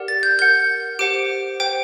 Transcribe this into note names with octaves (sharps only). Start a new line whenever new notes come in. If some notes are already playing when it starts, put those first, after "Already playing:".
Already playing: G4 A#4 D5 F#5
A6
G6
A#4 F#5 G6
G4 C5 F#5 D7
C5 G5 D7